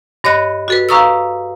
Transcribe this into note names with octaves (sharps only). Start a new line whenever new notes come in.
G2 C#5 D#5 B5 F#6
F#4 A4 B4
B4 F5 A#5 C#6 D#6 E6